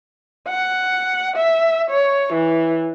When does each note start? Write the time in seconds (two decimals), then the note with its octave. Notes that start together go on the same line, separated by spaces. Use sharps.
0.48 F#5
1.36 E5
1.90 C#5
2.33 E3